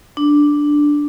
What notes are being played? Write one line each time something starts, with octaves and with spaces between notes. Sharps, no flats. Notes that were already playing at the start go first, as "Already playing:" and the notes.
D4